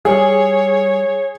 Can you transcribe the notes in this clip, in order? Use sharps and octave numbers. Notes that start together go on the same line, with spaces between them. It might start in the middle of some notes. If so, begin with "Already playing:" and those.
G3 G#4 C#5